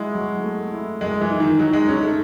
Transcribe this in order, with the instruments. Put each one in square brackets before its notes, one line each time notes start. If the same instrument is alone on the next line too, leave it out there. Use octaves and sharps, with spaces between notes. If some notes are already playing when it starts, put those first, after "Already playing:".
Already playing: [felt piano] F#3 E4 [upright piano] G#3
[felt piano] F#3
A3
E4
[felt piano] F#2 [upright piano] G#3
[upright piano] E3
[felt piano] D#4
[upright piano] D#3
[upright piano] F#3 [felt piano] D#4
[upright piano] G#3
[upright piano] C#4 [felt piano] D#4
[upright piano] A3